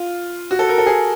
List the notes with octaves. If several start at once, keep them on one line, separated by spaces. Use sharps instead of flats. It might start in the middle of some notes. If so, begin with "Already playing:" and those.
Already playing: F4
F#4
A4
A#4
A4
G#4